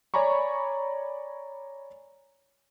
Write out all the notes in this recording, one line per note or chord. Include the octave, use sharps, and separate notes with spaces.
C#5 D5 G#5 A#5 B5 C#6